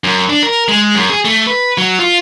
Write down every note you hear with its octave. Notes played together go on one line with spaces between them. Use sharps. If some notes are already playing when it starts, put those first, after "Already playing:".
F#2
D4
A#4
G#3
F#2
G#4
A3
B4
F#3
F4